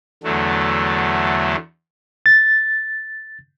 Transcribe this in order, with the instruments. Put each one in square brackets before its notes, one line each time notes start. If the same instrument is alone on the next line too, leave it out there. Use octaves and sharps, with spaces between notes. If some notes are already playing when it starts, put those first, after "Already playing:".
[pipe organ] E2 D3 F#3 A3
[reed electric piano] A6